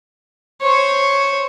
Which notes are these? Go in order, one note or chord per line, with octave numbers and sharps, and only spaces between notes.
C5 C#5